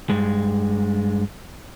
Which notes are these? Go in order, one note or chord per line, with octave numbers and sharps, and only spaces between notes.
G2 G#3